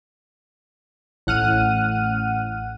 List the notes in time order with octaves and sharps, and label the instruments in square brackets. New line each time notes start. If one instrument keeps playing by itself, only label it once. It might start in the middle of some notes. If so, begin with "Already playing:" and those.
[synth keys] A1 F#5 F6 D#7